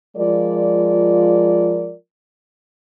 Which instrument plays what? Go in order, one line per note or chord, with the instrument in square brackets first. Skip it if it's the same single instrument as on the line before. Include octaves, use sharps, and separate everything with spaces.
[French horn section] F3 G#3 F4 A#4 D5